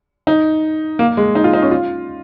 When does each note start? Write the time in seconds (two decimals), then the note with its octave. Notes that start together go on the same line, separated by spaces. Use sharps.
0.27 D#4
0.99 A#3
1.17 G#3
1.35 D#4
1.44 F4
1.53 D#4
1.62 C#4
1.71 F4